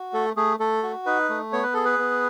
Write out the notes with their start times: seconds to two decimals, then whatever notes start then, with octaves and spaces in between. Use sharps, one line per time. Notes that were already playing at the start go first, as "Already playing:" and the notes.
Already playing: F#4
0.13 A3 A4
0.36 A3 G#4
0.60 A3 A4
0.83 F#4
1.06 D#4 B4
1.29 A3
1.52 B3 C#5
1.63 B4
1.74 G#4 A4
1.85 B4
1.99 B3